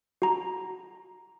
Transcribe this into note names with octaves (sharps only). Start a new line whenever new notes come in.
F#4 A#5